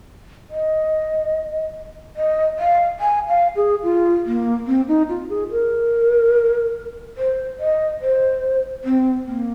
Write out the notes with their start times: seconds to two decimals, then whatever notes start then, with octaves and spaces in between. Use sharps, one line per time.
0.50 D#5
2.16 D#5
2.59 F5
3.00 G#5
3.28 F5
3.56 G#4
3.83 F4
4.26 A#3
4.67 C4
4.88 D#4
5.09 F4
5.29 G#4
5.51 A#4
7.17 C5
7.59 D#5
8.01 C5
8.84 C4
9.26 A#3